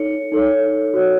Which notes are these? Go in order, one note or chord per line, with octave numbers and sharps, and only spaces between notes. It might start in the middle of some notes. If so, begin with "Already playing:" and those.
Already playing: D#4 A4 C#5 C#7
D#4 A4 C#5
F#4 C#5